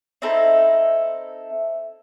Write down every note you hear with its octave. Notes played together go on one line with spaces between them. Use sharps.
C4 D#4 E4 A4